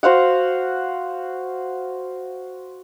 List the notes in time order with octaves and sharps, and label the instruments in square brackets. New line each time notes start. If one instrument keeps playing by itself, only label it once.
[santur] F#4 C5 F5 F#5